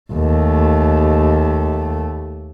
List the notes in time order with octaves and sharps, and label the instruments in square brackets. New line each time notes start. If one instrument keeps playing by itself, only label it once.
[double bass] D#2 A3